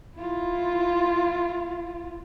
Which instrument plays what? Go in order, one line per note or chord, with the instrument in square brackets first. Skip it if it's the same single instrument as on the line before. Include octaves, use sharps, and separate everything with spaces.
[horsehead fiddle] E4 F4